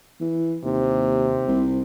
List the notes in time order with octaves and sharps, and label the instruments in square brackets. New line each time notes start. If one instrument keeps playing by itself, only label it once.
[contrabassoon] E3
[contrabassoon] D#2 [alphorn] C3
[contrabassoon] C2